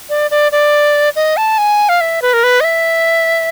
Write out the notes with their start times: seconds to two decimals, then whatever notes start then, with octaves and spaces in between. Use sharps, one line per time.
0.10 D5
0.31 D5
0.52 D5
1.16 D#5
1.37 A5
1.58 G#5
1.89 F5
2.01 E5
2.22 B4
2.33 A#4
2.44 B4
2.60 D#5
2.64 E5